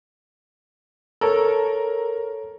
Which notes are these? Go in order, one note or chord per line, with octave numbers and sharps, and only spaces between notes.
A4 A#4 C#5